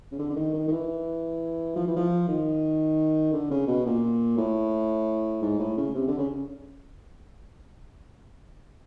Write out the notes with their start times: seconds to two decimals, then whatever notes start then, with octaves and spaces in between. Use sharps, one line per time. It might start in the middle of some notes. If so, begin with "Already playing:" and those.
0.11 C#3
0.19 D3
0.30 D3
0.36 D#3
0.54 D#3
0.68 D#3
0.72 E3
1.76 F3
1.87 E3
1.96 F3
2.29 D#3
3.33 D3
3.51 C#3
3.67 B2
3.86 A#2
4.38 A2
5.42 G#2
5.59 A2
5.77 C#3
5.95 C3
6.08 D3
6.18 C#3